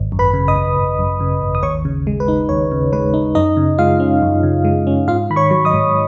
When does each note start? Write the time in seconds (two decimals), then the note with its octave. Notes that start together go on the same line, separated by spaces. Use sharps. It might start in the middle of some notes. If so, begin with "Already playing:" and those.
Already playing: G#1
0.12 F#2
0.19 B4 B5
0.34 C#3
0.48 D#5 D#6
0.56 G#1
0.77 G#1
0.99 F#2
1.20 C#3
1.41 G#1
1.55 D#6
1.63 D#2 C#5 C#6
1.85 C#3
2.07 G#3
2.20 B4
2.28 D#4
2.49 D#2 C#5
2.71 C#3
2.92 G#3 B4
3.14 D#4
3.35 F#2 D#4 D#5
3.57 C#3
3.78 G#3 F4 F5
4.00 C#4
4.22 F#2
4.43 C#3
4.65 G#3
4.87 C#4
5.08 G#2 F4 F5
5.30 D#3 B5
5.36 C#5 C#6
5.51 F#3
5.65 D#5 D#6
5.73 G#2